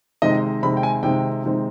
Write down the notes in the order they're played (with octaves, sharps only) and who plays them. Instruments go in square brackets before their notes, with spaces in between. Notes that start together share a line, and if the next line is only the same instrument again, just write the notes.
[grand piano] C3 D#3 G#3 C4 D#5
C3 D#3 G#3 C4 B5
G5
G#5
C3 D#3 G#3 C4 G5
C3 D#3 G#3 C4